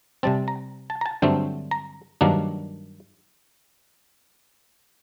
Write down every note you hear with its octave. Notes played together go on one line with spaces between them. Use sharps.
C3 G3 C4 A5
A#5
A5
A#5
A5
G2 D3 F#3 A3 C4 G5
A#5
G2 D#3 F#3 A#3 D4